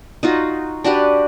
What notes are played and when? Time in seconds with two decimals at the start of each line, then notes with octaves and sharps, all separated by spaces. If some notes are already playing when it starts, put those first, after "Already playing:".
0.23 D#4 F4 F#4
0.84 D4 F#4 G4 B4